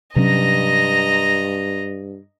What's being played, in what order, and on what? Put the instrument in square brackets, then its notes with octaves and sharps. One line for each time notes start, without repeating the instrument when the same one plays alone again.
[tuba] G2 [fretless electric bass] C3 F#3 C#4 [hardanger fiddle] D#5 A#5